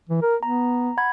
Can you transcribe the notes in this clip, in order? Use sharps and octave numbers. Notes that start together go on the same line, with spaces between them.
E3
A#4
B3 A#5
F#5 B5 G#6